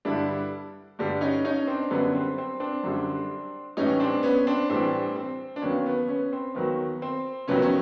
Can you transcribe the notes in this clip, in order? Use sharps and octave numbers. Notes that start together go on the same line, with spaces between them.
G2 D3 G3 D4 E4
G2 D3 G3
C#4 D#4
C#4 D#4
C4 D4
F#2 D3 G3 B3 C#4
C4
C4
C4 D4
F#2 D3 G3
A2 E3 G3 C#4 D#4
C4 D4
B3 C#4
C4 D4
A2 E3 G3 C4 D4
C4
D4
D#2 D#3 F#3 B3 C#4
B3
B3 C#4
C4
D#2 D#3 F#3 B3
C4
F2 C3 D#3 F#3 B3 C#4
C#4